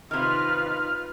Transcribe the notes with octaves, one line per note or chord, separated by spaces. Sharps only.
C3 D#3 D#4 F4 B4 F6